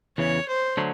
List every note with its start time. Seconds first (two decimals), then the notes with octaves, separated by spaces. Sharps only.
0.18 E2 C#3 E3 C#5
0.48 C5
0.77 D3 F#3 A3